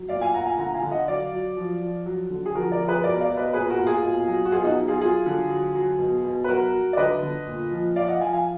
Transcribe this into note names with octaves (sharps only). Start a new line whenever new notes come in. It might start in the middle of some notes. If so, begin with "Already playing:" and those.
Already playing: F#3
A#2 D5 F5
F5 G#5
A#2 F#5 A#5
F5 G#5
D3 F#5 A#5
F5 G#5
D3
D#5 F#5
F#3 D5 F5
F#3
F3
F3
F#3
D3
G#4
F3 F#4 A#4
A#4 D5
F3
G#4 B4
B2 A#4 D5
D5 F5
B2
B4 D#5
A#2 G#4 B4
F#4 A#4
A#2
F4 G#4
B2
F#3
F#4
B2 F4 G#4
D#4 F#4
F#3
F4 G#4
F#3 F4 G#4
D3
F#3
F#3
B2
B2
B4
F#3 F#4 A#4
F#3
D5
D3 B4 D#5
D3
A#2
F3
F3 D5 F5
D#5 F#5
F3 F5 G#5
F5 G#5